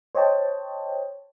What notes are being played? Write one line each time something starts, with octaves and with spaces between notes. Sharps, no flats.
C5 C#5 D#5 G5 A5